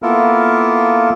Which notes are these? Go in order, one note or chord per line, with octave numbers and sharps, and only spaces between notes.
A#3 B3 E4 F4 A4 A#4